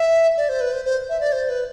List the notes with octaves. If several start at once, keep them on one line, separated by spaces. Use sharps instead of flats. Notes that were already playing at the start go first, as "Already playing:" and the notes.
Already playing: E5
D5
C5
B4
C5
C5
E5
D5
C5
B4